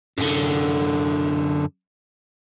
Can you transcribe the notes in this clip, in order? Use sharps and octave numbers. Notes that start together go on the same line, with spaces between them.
F#2 D3